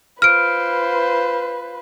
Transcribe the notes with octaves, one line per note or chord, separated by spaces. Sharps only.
F4 B4 C5 F6 D7